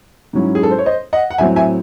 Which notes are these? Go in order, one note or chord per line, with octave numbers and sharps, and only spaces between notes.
G#2 F#3 C#4 E4
G#4
A4
C5
C#5
C5 D#5
D#5 F#5
F#5
A2 F#3 C4 E5 G#5
E5 G#5